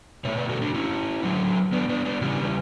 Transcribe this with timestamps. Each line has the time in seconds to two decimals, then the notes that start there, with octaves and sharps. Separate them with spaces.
0.25 B2 A3 C#5 E5
0.37 B4 D5
0.49 F#4 A4
0.61 D4 F#4
0.74 C#4 E4
1.23 D3 F#3 A3
1.73 B3 D4
1.89 B3 D4
2.05 B3 D4
2.21 C#3 E3 G3 B3 D4